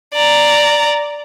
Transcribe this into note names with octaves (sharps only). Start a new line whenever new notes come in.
D5 A#5